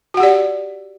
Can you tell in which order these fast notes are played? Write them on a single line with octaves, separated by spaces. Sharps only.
F#4 F#5 G4 D5